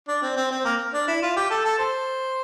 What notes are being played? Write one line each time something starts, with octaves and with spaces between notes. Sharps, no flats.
D4
C4
C4
C4
A#3
D4
E4
F4
G4
A4
A4
C5